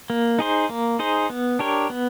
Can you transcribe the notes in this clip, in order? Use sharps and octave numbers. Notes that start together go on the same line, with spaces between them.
A#3
D#4 G#4 C5
A#3
D#4 G#4 C5
B3
D4 G4 A#4 C#5
B3